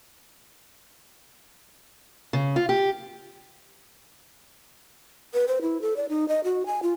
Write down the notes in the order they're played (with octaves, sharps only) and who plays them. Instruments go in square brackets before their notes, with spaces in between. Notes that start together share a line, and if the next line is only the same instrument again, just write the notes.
[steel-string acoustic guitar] C#3
F4
G4
[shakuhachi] B4
C5
E4
A4
D5
D#4
D#5
F#4
G#5
F4